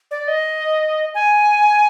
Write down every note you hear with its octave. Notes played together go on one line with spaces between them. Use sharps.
D5
D#5
G#5